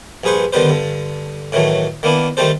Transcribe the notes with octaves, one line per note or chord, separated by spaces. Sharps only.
A#1 G2 G#4 B4 C5 C#6
D3 D#3 G3 B3 B4 C5
G2 D3
A2 D#3 E3 F#3 A3
D#3 A#3 B3 D4 E4
D#3 G3 A3 C4 A4 C5